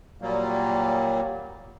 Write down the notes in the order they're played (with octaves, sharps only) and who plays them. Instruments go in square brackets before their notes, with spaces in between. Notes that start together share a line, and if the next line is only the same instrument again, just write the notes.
[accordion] A#2 F#3 G3 A#3